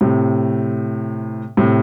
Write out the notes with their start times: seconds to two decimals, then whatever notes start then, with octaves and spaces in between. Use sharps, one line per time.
0.01 A2 C3
1.57 A2 C3